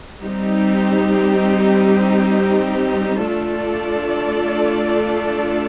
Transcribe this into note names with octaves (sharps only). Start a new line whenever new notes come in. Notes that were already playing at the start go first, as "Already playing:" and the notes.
G3 C4 D#4 G4
A3 D4 F4 A4 D5